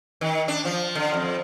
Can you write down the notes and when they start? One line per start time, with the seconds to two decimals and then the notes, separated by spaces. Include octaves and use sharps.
0.21 D#3
0.48 D4
0.65 F3
0.95 D3
1.13 F2